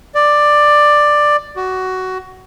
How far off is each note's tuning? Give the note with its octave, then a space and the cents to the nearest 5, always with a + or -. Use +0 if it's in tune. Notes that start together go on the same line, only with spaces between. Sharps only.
D5 +10
F#4 +15